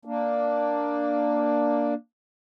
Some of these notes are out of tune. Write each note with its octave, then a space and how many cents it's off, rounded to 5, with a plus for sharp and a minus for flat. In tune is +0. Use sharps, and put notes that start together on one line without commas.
A#3 +0 D4 +0